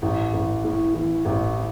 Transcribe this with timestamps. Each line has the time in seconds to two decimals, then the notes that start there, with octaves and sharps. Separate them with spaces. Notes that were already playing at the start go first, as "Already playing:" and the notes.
0.02 A1
0.33 A1
0.64 A2
0.94 E3
1.25 A1